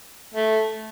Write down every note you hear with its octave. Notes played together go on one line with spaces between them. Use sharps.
A3